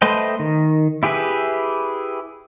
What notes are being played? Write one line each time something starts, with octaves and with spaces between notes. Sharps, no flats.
A3 B4 C5 D#5 G5
D#3
E4 G4 G#4 B4 E5